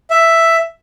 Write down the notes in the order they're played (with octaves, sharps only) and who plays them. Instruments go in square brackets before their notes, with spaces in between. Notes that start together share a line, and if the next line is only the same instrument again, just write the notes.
[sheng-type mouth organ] E5